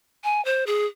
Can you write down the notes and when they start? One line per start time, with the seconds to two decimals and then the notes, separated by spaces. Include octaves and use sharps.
0.24 G#5
0.45 C5
0.66 G#4